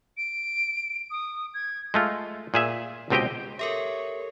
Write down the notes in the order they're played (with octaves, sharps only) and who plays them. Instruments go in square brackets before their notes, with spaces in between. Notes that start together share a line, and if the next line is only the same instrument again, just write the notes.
[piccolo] D7
D#6
G#6
[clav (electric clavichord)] G#3 A3 F4
A#2 G#4 E5
C#2 B2 C4 G4 D#5 G5
[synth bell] G4 A4 A#4 [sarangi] C#5 [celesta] E5